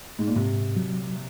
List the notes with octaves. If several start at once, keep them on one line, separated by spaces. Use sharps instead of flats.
G#2
A#2
G#2 C3
F#3